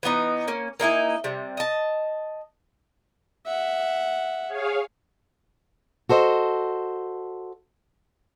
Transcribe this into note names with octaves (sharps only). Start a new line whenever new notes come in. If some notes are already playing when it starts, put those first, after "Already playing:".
E3 A3 B3 D#4
A#3 C#4
A#3 D#4 E4 G#5
C3 G3
D#5 A5
E5 F#5
G#4 C#5 F5
F#4 A4 C5 D#5